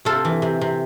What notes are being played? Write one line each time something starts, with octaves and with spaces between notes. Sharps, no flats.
C3 F4 A4
E3
C3
C3